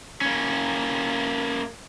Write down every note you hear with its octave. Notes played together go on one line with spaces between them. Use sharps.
A#3 C#4